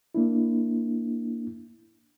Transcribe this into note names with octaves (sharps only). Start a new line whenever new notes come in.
A#3 D4 E4